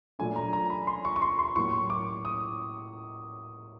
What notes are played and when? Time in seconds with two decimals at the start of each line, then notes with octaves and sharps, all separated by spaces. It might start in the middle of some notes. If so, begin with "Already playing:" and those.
0.19 A#2 F#3 A3 D4 G#5
0.36 A#5
0.53 A#5
0.70 B5
0.87 C6
1.05 C#6
1.16 C#6
1.22 C6
1.39 C6
1.56 A2 F#3 A#3 C#6
1.90 D6
2.25 D#6